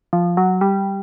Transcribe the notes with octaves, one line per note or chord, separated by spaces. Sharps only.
F3
F#3
G3